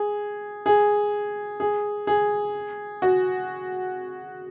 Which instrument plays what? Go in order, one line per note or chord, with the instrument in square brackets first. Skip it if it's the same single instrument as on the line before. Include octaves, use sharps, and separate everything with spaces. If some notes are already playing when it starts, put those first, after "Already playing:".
Already playing: [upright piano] G#4
G#4
G#4
G#4
F#4